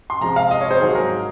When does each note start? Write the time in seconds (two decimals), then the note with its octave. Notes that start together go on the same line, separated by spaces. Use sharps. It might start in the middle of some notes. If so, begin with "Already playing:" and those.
0.10 C6
0.21 C3 F3 G#3 C4 A#5
0.36 F5
0.51 D#5
0.61 C#5
0.71 C5
0.80 G#2 D#3 F#3 G#4
0.95 A#4